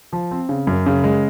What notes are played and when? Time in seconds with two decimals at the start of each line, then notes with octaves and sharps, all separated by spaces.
0.13 F3
0.31 C4
0.49 C#3
0.67 F#2
0.86 C#3
1.04 G#3